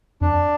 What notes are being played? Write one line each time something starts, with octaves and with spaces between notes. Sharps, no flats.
F2 D4